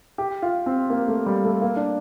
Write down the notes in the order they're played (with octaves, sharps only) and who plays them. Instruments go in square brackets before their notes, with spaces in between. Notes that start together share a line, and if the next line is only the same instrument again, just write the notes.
[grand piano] G4
F4
C4
A#3
A3
G3
A3
A#3
D4